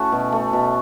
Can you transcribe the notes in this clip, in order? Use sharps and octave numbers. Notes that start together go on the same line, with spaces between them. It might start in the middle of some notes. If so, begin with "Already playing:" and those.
Already playing: A3 C#4 E4 F#4 A4
B2
A3
B2